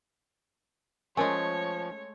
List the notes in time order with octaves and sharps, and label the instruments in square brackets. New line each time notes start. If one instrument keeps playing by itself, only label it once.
[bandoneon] F3 [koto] G#3 A3 [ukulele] C#4 A#4 G#5 [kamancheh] C#5